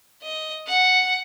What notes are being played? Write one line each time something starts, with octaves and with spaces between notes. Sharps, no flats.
D#5
F#5